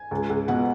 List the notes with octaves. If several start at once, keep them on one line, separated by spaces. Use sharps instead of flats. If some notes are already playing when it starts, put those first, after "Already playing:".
Already playing: G#5
C#2
C#2
B2 F#5